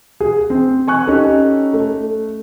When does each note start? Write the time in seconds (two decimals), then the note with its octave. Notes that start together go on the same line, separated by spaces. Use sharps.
0.20 G#4
0.50 C4
0.88 G#5 C#6 F#6
1.07 C#4 D#4 G4 A4
1.73 A3